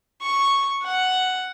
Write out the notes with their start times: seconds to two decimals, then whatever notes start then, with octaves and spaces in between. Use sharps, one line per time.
0.22 C#6
0.83 F#5